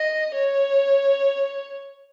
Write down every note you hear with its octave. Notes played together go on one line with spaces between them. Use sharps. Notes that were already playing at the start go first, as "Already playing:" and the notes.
Already playing: D#5
C#5